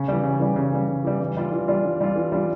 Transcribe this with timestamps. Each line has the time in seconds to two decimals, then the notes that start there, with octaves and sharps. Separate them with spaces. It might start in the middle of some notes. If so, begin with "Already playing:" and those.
Already playing: C#3
0.08 E3 G3
0.23 C#3
0.40 E3 G3
0.56 C#3
0.73 E3 G3
0.88 C#3
1.05 E3 G3
1.20 E3
1.37 G3 D4 F4
1.52 E3
1.68 G3 D4 F4
1.84 E3
2.00 G3 D4 F4
2.16 E3
2.32 G3 D4 F4